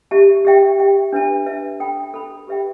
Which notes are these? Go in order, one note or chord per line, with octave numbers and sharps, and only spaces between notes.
G4 E5 A5
G4 E5 G5
G4 E5 G5
D4 B4 E5 A5
D4 B4 E5 A5
A4 G5 B5
A4 G5 B5
G4 B4 E5 G5